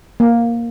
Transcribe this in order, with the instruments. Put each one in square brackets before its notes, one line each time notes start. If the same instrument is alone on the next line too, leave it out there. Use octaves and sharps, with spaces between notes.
[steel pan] A#3